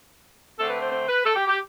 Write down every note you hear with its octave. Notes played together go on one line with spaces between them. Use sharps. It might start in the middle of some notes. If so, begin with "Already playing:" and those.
D3 A3 C4 A4
B4
C5
C5
B4
A4
G4
G4